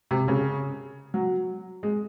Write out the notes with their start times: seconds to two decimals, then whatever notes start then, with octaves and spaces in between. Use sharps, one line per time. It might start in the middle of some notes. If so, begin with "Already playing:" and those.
0.11 C3
0.28 C#3
1.14 F#3
1.83 G#3